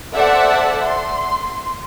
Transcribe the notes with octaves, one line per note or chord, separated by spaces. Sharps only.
A4 C5 D5 E5 F#5 A5
C6